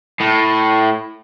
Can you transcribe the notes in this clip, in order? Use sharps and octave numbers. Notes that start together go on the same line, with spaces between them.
A2